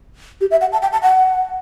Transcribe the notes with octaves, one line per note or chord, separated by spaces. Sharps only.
G4
E5
F#5
A5
G5
A5
F#5